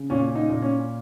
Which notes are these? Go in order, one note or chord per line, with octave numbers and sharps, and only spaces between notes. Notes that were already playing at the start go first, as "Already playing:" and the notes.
Already playing: C#3
A#2 C#4
D#4
A#2
C#4